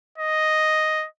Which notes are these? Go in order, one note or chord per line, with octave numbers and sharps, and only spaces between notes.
D#5